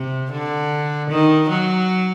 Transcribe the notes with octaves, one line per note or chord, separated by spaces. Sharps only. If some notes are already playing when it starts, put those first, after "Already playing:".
Already playing: C3
D3
D#3
F#3